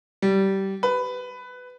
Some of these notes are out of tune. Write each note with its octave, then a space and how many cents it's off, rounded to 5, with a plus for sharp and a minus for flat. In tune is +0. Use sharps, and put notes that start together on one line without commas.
G3 -20
B4 +15